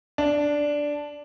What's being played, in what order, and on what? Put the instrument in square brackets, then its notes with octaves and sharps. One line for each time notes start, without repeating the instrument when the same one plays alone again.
[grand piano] D4